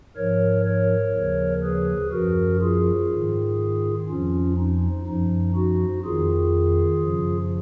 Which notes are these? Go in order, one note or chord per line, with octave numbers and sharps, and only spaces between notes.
G#2 F3 A#4 C#5
A#4 C#5
D#2 C#3 F3
G#4 B4
F#2 F3 F#4 A#4
F4 G#4
G#2 D#3
F2 F3 C#4 F4
D#4
F#2 F3 D#4
D#4 F#4
F2 D#3 F4 G#4
F#2 C#3 F3